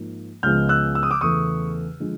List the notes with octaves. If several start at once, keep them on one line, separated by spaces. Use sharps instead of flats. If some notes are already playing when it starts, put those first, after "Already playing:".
Already playing: G#2 F3 A#3
C#2 C#3 F3 G#3 B3 F6 G6
E6 F#6
E6
D#6
D6 E6
E2 C#3 E3 A3 C#6 D#6
D3 F3 G#3